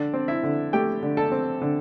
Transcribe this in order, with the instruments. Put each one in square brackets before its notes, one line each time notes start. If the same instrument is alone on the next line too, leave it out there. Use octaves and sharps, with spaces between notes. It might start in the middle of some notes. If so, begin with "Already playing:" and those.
Already playing: [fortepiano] D3 D4 D5
C4
E4 E5
D3
A3 G4 G5
D3
A4 A5
C4
D3